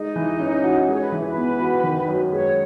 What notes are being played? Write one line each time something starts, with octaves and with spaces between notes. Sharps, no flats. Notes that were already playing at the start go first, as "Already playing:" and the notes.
Already playing: G#3 D#4
E3
C#4
F#4
G#3 G#4
C#5
B4
E3
B4
B3
F#4
D#3
F#2
G#3 C#5